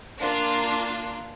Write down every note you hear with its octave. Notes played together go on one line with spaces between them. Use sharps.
A#3 D4 F4